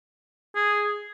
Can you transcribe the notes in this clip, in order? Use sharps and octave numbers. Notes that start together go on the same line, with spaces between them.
G#4